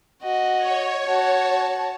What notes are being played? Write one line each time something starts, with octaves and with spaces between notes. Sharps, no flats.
F#4 D#5
C#5
F#4 A5